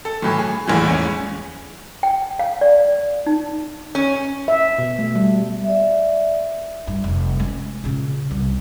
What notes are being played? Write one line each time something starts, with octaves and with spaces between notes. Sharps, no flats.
A4
B1 A2 E3
G#4
A#1 E2 A2 E3
E2 G#2 C#4
G5
F5
D5
D#4
C#4
E5
B2
A3
G3
D5 E5
G2
F1
G#3 C#4
A#2 C#3
C2